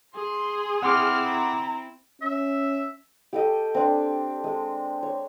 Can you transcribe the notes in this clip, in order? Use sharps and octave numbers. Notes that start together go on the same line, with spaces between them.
G#4 C6
C4 E4 F#5 C6 D6 F6
A#5
C#4 E5
G4 A4 D#5
C4 D4
G#3
C#5